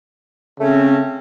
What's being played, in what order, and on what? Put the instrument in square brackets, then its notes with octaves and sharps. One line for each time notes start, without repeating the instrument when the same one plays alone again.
[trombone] C#3 [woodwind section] A3 C4 C#4